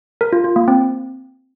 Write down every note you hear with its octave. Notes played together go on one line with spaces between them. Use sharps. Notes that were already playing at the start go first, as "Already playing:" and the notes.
A#4
F4
F4
A#3
C4